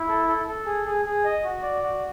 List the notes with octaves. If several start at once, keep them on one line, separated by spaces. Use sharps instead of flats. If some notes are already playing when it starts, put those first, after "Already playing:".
Already playing: E4
A4
A4
A4
G#4
G#4
G#4
D#5
F#4
D5
F#4